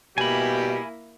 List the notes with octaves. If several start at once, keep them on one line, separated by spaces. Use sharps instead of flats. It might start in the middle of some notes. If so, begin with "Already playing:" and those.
B2 G3 A#3 E4 G4 G#5 B5